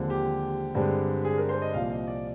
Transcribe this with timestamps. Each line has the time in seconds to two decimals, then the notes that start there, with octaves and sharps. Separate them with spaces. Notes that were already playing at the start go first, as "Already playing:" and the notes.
Already playing: D#2 D3 F3 G#3 C4
0.10 G4
0.75 G2 D3 G#3 C4
1.25 G#4
1.37 A#4
1.49 C5
1.62 D#5
1.74 C2 A#2 F3 F5
1.90 D#5
2.07 D5